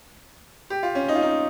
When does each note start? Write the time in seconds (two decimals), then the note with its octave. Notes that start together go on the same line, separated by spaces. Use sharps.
0.70 G4
0.83 F4
0.95 C#4
1.08 D#4
1.15 F4
1.22 D#4